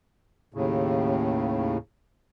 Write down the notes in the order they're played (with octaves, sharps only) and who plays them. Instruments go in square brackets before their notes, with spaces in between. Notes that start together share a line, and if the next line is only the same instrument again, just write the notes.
[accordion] D#2 A2 C#3